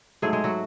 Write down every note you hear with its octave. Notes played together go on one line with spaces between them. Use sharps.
G#2 F#3 G#3 A3 G#4
G#3 G#4
F#3 F#4